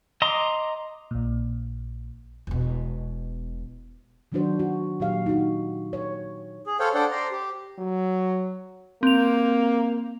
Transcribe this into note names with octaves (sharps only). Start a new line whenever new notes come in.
D#5 A#5 C6 D6 D#6
A#1 A#2
E1 B2
D#3 F#3 B3 D4 F#4 C5
F#4
A#2 F#3 G4 F5
D#4 F#4
C#5
G#4
A4 C5 C#5 F5 G5
D4 A4 C5 D5 F#5 G5
C5 D5 A#5 C6
G4
F#3
A#3 C4 F7